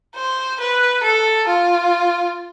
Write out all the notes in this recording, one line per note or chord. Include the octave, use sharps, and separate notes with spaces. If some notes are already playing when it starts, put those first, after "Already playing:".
C5
B4
A4
F4